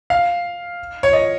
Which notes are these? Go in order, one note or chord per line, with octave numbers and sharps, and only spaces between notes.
F5
C#5
D#5